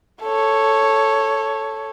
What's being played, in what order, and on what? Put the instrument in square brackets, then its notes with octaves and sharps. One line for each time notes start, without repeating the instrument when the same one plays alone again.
[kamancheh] A4 C#5